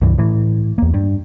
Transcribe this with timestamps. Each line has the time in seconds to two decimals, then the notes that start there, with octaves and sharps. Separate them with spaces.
0.02 C#2 G2 E3
0.18 A2 E3
0.78 E2 A#3
0.94 G2